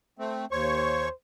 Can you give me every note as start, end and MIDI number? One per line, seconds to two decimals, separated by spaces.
0.19 0.46 57
0.19 0.46 60
0.52 1.09 39
0.52 1.12 72
0.52 1.09 73
0.52 1.09 85